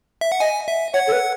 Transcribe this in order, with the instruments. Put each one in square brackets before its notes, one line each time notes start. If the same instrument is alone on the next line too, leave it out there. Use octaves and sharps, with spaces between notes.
[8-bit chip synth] E5
F#5
[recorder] D#5 [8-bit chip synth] G#5
[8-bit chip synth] E5
[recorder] C#5 [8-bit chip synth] F#5
[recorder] A4
B4